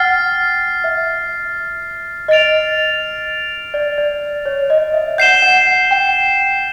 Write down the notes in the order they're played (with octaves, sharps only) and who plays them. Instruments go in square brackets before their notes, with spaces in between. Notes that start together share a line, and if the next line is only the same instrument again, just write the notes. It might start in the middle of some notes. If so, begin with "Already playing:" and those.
Already playing: [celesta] F#5 G5 [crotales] F6 A6 C7
[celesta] E5
[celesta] D#5 [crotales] F6 A6 D7 F7
[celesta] D5
D5
C#5
D#5
E5
[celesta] F#5 [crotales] G6 C7 E7 G7
[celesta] F#5
F#5
G5